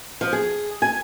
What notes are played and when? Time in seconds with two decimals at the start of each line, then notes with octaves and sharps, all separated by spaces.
0.21 F3
0.33 G#4
0.82 G#5